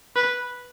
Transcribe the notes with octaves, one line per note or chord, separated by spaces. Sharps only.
B4